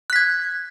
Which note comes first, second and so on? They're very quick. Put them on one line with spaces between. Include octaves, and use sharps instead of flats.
F#6 B6 G#6